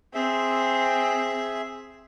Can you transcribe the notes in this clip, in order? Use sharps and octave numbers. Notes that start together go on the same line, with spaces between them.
C4 G#4 E5